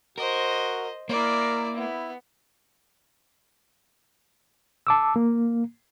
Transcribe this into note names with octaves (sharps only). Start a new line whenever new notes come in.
F#4 A#4 C5 D#5
A#3 E4 A#4 D5
B3 E4
A5 D6 E6
A#3